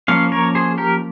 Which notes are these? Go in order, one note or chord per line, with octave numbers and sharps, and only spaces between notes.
F3 A#3 C#4 C#5 F5
A#4 C#5
G#4 C5
G4 A#4